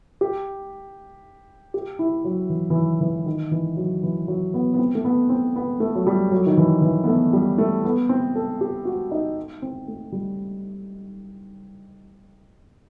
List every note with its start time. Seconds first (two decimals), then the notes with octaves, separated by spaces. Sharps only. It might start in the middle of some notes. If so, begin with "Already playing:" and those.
0.21 G4
1.74 G4
1.99 E4
2.24 F#3
2.50 E3
2.70 E3
2.75 D#3
3.01 E3
3.26 D#3
3.51 E3
3.77 F#3
4.03 E3
4.28 F#3
4.54 B3
4.74 B3
4.79 C4
4.95 A3
5.05 B3
5.29 C4
5.56 B3
5.80 A3
5.95 F#3
6.07 G3
6.32 F#3
6.46 D#3
6.57 E3
6.82 E3
7.04 B3
7.07 A3
7.33 G3
7.58 A3
7.84 B3
8.09 C4
8.35 A4
8.61 G4
8.85 F#4
9.11 D#4
9.62 C4
9.88 A3
10.12 G3